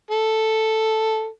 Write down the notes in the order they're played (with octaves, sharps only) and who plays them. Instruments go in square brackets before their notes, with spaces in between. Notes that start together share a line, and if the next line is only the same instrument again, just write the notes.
[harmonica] A4